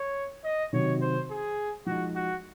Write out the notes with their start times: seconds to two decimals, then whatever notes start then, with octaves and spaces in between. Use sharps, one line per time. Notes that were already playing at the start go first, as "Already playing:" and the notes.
Already playing: C#5
0.44 D#5
0.73 C3 D#3 F#3 C#5
1.01 C5
1.30 G#4
1.86 F3 G#3 D#4 F#4
2.15 F#4